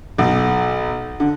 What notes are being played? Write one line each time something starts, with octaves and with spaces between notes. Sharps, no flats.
B1
D3